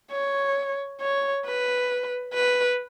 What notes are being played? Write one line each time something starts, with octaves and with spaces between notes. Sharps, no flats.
C#5
C#5
B4
B4